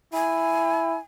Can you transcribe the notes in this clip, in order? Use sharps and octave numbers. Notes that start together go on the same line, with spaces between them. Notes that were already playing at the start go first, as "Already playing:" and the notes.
E4 G#5